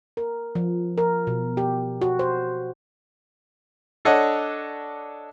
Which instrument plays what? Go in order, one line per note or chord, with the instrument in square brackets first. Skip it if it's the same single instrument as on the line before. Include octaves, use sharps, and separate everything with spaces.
[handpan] A#4
F3
A#4
B2
G4
F#4
C5
[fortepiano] D4 A4 C#5 D#5 F#5